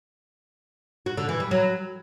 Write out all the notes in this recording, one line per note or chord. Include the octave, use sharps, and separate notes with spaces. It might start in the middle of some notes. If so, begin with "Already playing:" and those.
F#4
D3
E3
G3
F#3